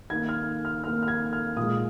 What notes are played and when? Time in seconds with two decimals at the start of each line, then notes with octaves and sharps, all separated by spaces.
0.10 D#3 G#6
0.13 A#3
0.29 F6
0.65 F6
0.83 D#3 F6
0.87 A#3
1.03 F6
1.08 G#6
1.33 F6
1.57 A#2 G#3 D#6